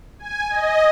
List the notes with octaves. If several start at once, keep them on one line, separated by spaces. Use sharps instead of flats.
G#5
D#5